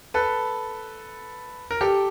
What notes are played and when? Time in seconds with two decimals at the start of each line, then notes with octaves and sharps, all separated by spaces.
0.14 A4 B4
1.71 A#4
1.81 G4 A4